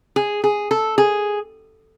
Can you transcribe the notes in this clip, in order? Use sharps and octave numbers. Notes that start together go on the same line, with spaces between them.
G#4
G#4
A4
G#4